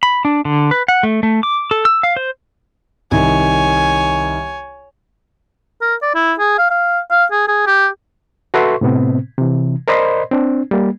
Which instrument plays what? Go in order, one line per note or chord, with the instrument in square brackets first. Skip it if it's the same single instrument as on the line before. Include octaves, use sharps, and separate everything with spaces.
[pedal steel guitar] B5
D4
D3
B4
F#5
A3
A3
D6
A4
E6
F5
C5
[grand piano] C2 D#3 [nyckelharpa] C#5 G#5
[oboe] A#4
D5
E4
G#4
F5
F5
F5
G#4
G#4
G4
[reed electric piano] F#4 A4 B4 E5 C6 C#6
A2 C3 B3 C4
C3 E3
A#4 C5 D5 D#5 B5 C6
C4 D4
G3 A#3